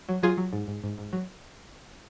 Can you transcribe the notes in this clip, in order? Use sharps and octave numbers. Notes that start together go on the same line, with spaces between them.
F#3
F#3 F4 G#4
F#3
G#2
G#2
G#2
G#2
F#3